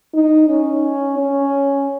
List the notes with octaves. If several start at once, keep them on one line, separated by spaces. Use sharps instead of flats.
D#4
C#4
C#4